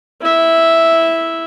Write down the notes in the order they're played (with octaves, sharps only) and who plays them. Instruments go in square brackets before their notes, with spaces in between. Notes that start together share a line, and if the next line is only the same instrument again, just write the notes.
[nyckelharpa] E4 E5